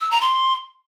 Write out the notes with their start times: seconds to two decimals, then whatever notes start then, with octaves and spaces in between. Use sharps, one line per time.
0.01 E6
0.11 A#5
0.21 C6